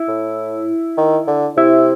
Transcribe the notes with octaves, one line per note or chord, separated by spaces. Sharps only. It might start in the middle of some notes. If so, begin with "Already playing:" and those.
Already playing: E4
A2
D#3
D3
C3 E4